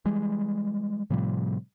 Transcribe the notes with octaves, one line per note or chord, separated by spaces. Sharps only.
E3 G3 G#3
A2 C3 F3 G3